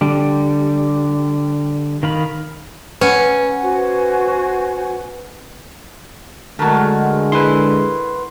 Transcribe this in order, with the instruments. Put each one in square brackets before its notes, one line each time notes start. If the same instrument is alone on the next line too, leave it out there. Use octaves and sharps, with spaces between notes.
[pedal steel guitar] D3 G3
D#3 F5 B5
[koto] C#4 [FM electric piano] B4 F#5
[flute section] F#4 C5 G#5
[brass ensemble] D3 G#3 [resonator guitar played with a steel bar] F#3 A3 [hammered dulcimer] F#4 A#4
[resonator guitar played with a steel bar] E4 [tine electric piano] B4 C6